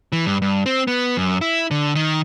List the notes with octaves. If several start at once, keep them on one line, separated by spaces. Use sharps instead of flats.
E3
G2
G2
C4
B3
F#2
E4
D3
D#3